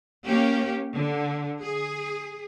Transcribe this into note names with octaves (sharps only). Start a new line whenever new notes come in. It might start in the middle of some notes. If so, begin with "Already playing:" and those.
A#3 C#4 G4
D3
G#4